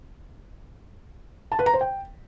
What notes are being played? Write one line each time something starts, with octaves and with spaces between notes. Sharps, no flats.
A5
B4
A#5
C5
G5